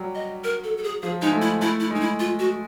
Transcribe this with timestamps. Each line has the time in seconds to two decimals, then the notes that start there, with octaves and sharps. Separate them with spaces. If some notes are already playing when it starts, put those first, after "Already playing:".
Already playing: F#3 G3
0.15 D#5
0.44 A#4
0.64 A4
0.77 A4
0.84 G#4
1.02 F3 G#4
1.22 G#3 D#4
1.32 A3
1.42 E4
1.61 A3 E4
1.80 E4
1.90 G#3 D#4
2.01 E4
2.20 F4
2.39 F#4